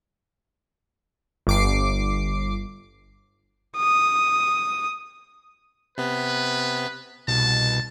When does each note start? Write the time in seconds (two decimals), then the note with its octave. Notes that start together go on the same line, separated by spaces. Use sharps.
1.47 G1 D6 C7
3.77 D#6
5.98 C3 B3 B4
7.28 C2 B2 A5